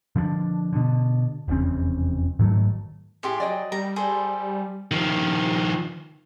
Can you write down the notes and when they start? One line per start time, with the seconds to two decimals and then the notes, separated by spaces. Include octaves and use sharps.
0.16 D3 F3 A3 D4
0.73 B2 D3
1.48 F1 E2 C#3 C4
2.39 G#2 D#3 F#3 A3
3.23 A2 G4 G#4 C6
3.40 F#3 D5 D#5 G5
3.72 G3 A#5
3.96 G#4 A4 C5
4.91 D#3 F3